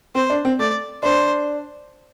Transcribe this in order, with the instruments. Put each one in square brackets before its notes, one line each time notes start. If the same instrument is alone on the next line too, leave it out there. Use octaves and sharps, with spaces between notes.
[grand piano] C4 [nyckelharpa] C5
[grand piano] D4
C4
[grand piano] A3 [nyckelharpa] D5
[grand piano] D4 [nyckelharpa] C5